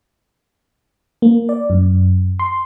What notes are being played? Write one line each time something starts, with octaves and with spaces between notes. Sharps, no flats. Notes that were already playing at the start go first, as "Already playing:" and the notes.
A#3
D5
F#2
C6